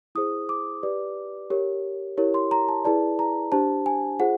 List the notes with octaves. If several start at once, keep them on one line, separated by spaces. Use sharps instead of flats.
E4 G#4 C5 D#6
D6
G4 B4 D5
G4 A#4 C#5
E4 G4 A#4 C#5
C6
A#5
A5
E4 G#4 B4 D5 A5
A#5
D4 G4 C5 A5
G#5
F4 G#4 C5 F#5